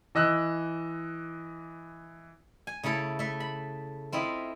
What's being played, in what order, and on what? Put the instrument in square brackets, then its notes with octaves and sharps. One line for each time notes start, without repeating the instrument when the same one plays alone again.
[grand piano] E3 D#5 E6 F#6
[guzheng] G#5
C#3 A3 E4 A4
A3 E5
B5
C4 E4 F4 D#5 B5